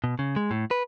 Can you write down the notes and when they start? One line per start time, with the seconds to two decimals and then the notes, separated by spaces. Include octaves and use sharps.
0.04 B2
0.19 C#3
0.36 G#3
0.51 A2
0.71 B4